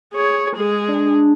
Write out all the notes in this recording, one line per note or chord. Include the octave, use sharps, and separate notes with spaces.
G#4 C#5
G#3 G#4
D4